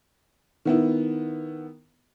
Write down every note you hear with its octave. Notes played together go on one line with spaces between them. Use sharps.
D#3 B3 E4